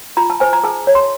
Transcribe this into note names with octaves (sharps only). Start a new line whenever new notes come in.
F4 A#5
A5
C5 G#5
A#5
G#4 A5
C#5
C6